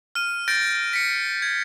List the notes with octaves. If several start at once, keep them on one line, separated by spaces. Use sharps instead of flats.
F6 D#7
G6 A6 A#6 D7
B6 C#7
G#6